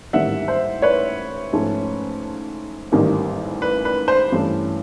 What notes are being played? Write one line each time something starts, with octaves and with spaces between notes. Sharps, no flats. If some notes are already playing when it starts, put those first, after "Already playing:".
A1 G#2 D#3 G3 A#3 E5 F#5
C5
B4 C#5
G#2 F3 A3 C#4
A1 G#2 D#3 G3 A#3
B4
B4
C5
G2 E3 A3 C#4